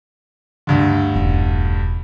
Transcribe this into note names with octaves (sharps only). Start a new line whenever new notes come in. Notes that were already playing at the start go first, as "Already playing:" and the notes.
D2 G2 D3
E1 C#4